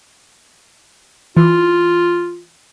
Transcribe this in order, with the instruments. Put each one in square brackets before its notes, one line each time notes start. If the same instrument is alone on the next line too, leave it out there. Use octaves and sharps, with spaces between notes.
[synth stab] E3 [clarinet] F4